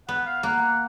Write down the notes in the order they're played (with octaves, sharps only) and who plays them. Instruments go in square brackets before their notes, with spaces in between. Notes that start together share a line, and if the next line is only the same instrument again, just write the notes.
[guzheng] B3 [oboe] F#5
[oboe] F5
[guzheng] A#3 [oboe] F#5
[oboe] F#5